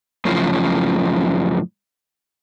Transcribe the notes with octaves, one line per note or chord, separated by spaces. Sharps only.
F#2 A2 C#3 F3